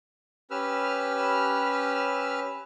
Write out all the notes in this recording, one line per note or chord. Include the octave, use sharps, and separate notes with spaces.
C#4 G4 B4 E6 F6